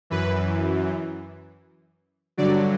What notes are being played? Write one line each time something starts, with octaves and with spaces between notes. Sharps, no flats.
F#2 E3 B4
G2 D3 F#3 D5